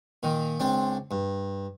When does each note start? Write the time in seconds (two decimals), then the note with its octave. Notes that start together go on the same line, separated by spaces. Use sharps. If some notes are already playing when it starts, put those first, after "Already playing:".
0.23 A#2 D#3
0.60 C#2 C4 D4
1.11 G2